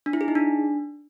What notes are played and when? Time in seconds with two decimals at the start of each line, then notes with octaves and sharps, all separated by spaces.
0.06 D4
0.13 E4
0.21 G#4
0.28 D#4
0.35 D4